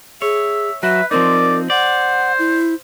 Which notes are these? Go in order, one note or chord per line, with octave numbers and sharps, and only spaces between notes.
G#4 C#5 E5
F#3 F#4 B4 E5
F3 C4 D#4 A#4 D5
C5 D5 F#5
E4